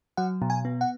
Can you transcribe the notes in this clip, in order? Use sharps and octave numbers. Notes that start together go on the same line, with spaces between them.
F#3 F#5
B2
G#5
B3
F#5